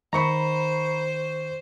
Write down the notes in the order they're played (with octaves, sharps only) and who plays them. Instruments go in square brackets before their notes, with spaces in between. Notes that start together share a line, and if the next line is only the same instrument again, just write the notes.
[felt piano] D#3 C#6 C#7 [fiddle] C5 [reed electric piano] A#5 B5